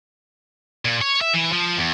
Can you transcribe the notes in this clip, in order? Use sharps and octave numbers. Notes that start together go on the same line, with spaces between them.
A#2
C#5
E5
E3
F3
E2